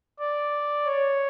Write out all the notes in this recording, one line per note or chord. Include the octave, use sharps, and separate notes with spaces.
D5
C#5